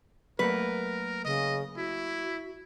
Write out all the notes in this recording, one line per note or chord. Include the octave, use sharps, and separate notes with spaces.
F#3 A3 A#3 A#4 B4
C#3 D#5
E4 F#4